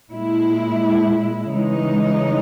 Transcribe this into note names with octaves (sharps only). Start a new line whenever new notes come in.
A#2 G#3 E4
C#3 E3 G#3 D#4